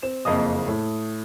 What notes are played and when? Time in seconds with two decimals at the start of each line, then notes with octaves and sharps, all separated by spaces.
0.03 C4 E7
0.25 F#1 F2 A#3 D#5 D#6
0.68 A2